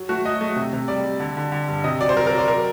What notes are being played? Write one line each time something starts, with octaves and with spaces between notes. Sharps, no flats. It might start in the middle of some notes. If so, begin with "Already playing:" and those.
Already playing: F#3
A3 F#4
F#3 D#5
A3
C3
C3
G3 D5
G3
D3
D3
D3
G2
C3 D#5
F#3 D5
C5
F#3 A#4
A#4
F#3
D5
F#3 A#4